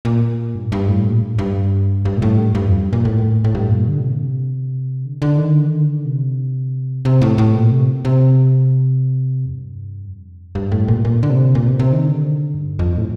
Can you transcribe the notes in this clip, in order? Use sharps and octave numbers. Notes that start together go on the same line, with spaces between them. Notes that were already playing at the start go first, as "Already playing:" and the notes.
A#2
G2
G2
A2
A#2
G2
G2
G2
A#2
A2
G2
G2
F2
G2
A#2
A2
A2
G2
A#2
D3
C3
A#2
C3
D3
D3
D#3
D3
D#3
D3
C3
C3
A2
A2
A#2
C3
C3
F2
G2
F2
G2
A2
A#2
A#2
D3
C3
A#2
C3
C3
D#3
D3
G2
F2
A2